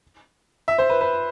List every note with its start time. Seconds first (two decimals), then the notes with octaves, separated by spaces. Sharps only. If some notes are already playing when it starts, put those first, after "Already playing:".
0.68 E5
0.78 C5
0.90 B4
1.01 B4